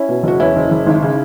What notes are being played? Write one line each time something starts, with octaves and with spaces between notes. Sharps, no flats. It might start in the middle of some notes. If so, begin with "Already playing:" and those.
Already playing: C#4 E4
B2
F#1 F#4
E2 C#4 E4
F#1
F#1
G#1
C#3